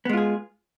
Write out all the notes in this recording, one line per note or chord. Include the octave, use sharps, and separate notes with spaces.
G#3 B3 F4 G#4